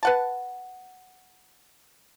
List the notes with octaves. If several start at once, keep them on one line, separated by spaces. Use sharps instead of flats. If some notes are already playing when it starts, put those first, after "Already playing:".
B4 F#5 A5